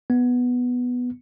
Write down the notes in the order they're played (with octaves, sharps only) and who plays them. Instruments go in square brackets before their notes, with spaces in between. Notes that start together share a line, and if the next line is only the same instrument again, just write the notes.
[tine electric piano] B3